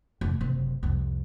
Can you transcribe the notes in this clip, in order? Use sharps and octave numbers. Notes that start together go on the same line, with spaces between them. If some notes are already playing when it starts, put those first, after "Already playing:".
F1
F#1 C3
C2 F2